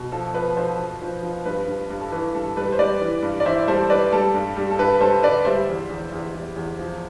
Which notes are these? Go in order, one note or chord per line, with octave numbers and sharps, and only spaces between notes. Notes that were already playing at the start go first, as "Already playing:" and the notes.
Already playing: B2
F3 A4
F3 B4
F3 A4 C5
F3
F3
F3
G2 B4
G2
G2
A4
E3 B4
G2 A4
G3 B4
C5
G3 B4 D5
E3
G2
D5
E3 C5 E5
G3 A4 C5
G3 B4 D5
G3 A4
G2
G3
A4
G2 B4
G3 A4 C5
D3 B4 D5
G3 C5 E5
E2
E2
E2
E2
E2
F3